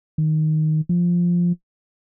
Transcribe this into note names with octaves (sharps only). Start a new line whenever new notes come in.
D#3
F3